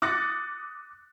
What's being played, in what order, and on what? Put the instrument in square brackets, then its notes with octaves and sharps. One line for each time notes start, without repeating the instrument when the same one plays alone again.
[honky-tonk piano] D6 D#6 F#6 A6 A#6 C#7